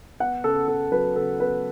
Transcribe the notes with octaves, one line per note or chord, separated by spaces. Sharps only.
B3 F#5
C#3 A4
C#3 A4
F#3 B4
C#3 A4
B3 B4